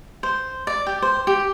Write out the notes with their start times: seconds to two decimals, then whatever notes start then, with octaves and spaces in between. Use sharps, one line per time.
0.23 C5
0.67 D5
0.87 G4
1.02 C5
1.27 G4